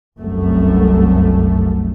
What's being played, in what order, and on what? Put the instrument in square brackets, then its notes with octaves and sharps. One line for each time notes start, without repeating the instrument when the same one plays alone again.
[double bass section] F1 C2 F#2 A3